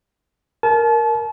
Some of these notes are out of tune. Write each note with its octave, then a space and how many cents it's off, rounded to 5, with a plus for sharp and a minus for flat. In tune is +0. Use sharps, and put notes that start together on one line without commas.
A#4 +0 A5 -35